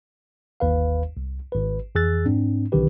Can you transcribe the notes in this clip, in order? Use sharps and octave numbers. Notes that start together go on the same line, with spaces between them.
G1 D#2 B4 F5
C2
G#1 B4
F2 E3 G#4 E6 F#6 A6
G#2 C4 D4
B1 D3 D#3 C#4 G4 B4